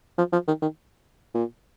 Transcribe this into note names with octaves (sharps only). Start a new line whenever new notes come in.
F3
F3
D#3
D#3
A#2